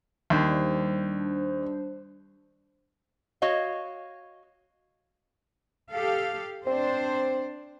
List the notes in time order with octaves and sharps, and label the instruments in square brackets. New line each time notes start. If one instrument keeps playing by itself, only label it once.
[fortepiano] D#2 [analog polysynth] G3 D4 C5
[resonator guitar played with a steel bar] F#4 C#5 D#5 F5
[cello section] G4 A4 F5
[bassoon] C4 [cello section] D4 C5